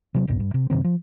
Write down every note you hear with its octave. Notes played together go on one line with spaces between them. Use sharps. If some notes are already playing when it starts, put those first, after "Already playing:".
C3 F#3 C4
D#1 B1 G2 A#2
G2
C3
F#2 C3 D#3 C4
F3